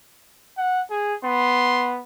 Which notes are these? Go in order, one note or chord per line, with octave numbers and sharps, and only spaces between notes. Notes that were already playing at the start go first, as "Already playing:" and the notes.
F#5
G#4
B3 C6